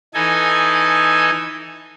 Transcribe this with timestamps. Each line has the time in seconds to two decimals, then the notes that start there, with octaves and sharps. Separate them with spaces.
0.14 E3 D#4 A4 D#5 G#5